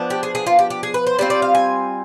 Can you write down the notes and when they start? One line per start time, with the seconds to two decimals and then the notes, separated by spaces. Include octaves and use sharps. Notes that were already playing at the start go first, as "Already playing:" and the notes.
Already playing: F3 B3 D4
0.10 G4
0.23 G#4
0.35 G#4
0.47 F4
0.59 G4
0.70 G4
0.83 G#4
0.94 B4
1.07 C5
1.19 G3 C4 F4 D5
1.30 D5
1.42 F5
1.55 G#5